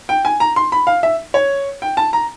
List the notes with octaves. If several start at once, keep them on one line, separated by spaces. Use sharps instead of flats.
G5
G#5
A#5
C6
B5
F5
E5
C#5
G5
A5
A#5